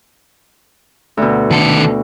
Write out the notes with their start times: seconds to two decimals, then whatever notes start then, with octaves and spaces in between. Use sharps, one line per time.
1.17 D2 B2
1.51 D#3 A4